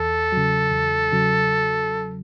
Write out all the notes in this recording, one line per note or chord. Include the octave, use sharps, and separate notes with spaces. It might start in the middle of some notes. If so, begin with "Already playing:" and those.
Already playing: E2 A4
C#3 F#3
E2
C#3 F#3